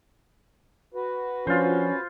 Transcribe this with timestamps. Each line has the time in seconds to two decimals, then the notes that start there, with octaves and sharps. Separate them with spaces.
0.94 F#4 B4
1.47 F3 C#4 D4 F4 C5